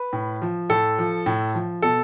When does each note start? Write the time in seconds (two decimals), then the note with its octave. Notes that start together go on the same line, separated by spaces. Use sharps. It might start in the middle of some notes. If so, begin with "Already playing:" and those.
Already playing: B4
0.13 A2
0.42 F3
0.69 A2 A4
0.99 F3
1.26 A2
1.55 F3
1.82 B2 A4